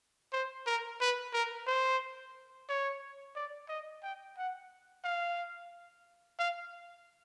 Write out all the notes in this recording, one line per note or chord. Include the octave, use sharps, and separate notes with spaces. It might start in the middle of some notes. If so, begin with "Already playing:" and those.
C5
A#4
B4
A#4
C5
C#5
D5
D#5
G5
F#5
F5
F5